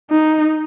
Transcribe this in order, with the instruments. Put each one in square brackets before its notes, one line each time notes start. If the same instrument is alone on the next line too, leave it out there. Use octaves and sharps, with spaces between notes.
[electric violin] D#4